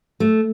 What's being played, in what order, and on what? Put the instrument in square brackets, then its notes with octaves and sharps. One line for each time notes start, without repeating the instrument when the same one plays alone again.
[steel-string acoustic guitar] A3